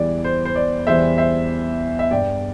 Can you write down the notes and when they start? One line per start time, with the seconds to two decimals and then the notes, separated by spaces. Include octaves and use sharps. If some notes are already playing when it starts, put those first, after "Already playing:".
Already playing: E2 E3 G3 D5
0.24 C5
0.45 C5
0.56 D5
0.87 E2 E3 G3 C5 E5
1.18 C5 E5
1.99 E5
2.11 G2 G3 D5 G5